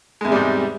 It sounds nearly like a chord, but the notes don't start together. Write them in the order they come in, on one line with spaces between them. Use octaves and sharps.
G#3 E2 C3 G3 G#2